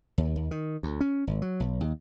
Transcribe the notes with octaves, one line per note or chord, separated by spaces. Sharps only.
D#2
D#2
D#3
D2
C#4
G#1
F#3
B1
D#2